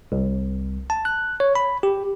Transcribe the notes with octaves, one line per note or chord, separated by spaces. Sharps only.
C2
A5
F#6
C#5
B5
G4